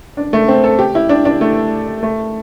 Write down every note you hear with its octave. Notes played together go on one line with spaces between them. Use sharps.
D4
A3
C4
A4
G4
E4
D4
D4
A3
A3